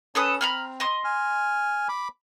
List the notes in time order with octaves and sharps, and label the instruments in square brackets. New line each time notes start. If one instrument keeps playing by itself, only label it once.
[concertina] C#4 [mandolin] A4 B4 D#6
[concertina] C4 [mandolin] A#5 B5 F6
[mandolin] D#5 C6
[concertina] G#5 F6
B5 D6